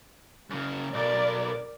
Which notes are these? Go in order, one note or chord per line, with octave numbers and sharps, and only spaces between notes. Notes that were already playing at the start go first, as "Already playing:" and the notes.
F#2 C#3
B1 A#4 D5